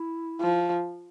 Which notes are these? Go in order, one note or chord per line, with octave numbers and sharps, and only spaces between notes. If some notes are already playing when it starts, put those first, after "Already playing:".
Already playing: E4
F3